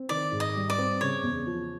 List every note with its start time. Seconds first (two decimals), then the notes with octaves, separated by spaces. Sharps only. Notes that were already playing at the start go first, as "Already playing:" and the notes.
Already playing: C4
0.09 D#3 D5
0.32 G#2
0.40 D#5
0.55 G3
0.70 D5
0.78 C4
1.01 C#3 C#5
1.23 E2
1.47 F3